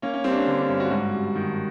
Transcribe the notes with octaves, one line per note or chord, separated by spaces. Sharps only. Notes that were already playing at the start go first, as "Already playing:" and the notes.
A#3 C#4
C#4
G3 C4
D4
C#4
D3 C#4
D4
G2 C#4
F#4
G#2 F#4
G3
D#3